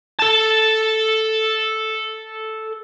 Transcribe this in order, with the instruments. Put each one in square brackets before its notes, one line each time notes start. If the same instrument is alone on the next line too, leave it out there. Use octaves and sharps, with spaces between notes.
[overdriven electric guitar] A4 A5